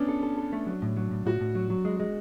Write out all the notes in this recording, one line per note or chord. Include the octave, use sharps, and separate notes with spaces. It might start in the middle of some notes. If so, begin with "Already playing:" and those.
Already playing: B3 C#4 D4
A4
A4
A4
A3
F#3
A2
F#3
A2
A2 F#4
A2
F#3
F#3
G#3
G#3